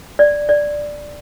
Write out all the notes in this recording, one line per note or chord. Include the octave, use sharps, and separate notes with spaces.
D5
D5